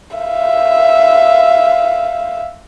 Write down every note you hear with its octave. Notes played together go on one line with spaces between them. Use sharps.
E5 F5